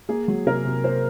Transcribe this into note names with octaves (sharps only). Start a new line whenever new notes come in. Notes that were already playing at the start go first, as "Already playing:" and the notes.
A#3 G#4
F#3
C3 A#4
C3
A#3 C5